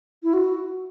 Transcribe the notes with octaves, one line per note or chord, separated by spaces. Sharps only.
E4
F#4